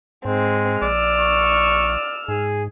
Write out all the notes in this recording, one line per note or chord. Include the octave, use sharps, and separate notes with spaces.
G#2 G#3 C4
A#1 D5 E6 F6
C#6
G#2 G#4